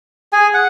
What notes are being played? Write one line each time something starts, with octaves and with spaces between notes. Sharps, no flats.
G#4 G#5
F#5